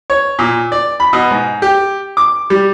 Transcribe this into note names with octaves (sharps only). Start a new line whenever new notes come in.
C#5
A#2
D5
B5
B2
G#2
G4
D6
G3